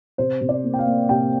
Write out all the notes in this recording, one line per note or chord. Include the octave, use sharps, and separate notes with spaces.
C3 C5
C3
D5
A#3
G5
F5
A#3
C3 G5